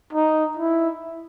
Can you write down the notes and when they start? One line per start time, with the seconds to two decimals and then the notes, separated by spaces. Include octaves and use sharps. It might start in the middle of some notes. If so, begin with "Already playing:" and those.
0.13 D#4
0.57 E4